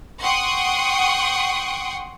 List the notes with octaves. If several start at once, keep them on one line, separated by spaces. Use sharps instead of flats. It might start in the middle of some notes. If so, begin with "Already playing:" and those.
F#5 G5 C6 C#6 D#6